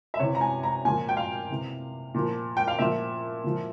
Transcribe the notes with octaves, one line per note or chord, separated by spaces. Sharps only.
E5
C3 E3 C#5
A#5
G#5
A#5
A#2 F3 G#5
G5
F5
C3 E3
A#2 F3
G5
F5
A#2 F3 E5
A#2 F3